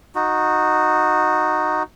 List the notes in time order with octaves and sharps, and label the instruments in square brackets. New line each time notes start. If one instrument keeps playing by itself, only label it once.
[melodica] D#4 F#4